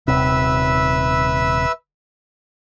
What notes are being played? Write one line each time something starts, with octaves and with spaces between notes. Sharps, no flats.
D#1 C3 B4 E5 E6